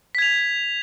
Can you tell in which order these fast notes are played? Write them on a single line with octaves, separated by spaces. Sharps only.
B6 G#6 F7